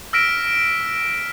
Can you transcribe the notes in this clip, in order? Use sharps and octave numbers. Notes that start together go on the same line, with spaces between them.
E6 F6 A#6 B6 D7 E7